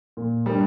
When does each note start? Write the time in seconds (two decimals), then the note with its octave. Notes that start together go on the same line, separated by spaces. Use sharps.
0.17 A#2
0.46 G3 A#3 D4